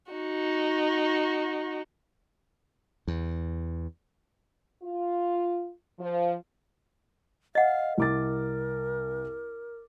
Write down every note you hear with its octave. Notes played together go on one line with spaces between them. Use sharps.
D#4 F#4
E2
F4
F3
D#5 F5 F#5
C2 A#4 D6 A6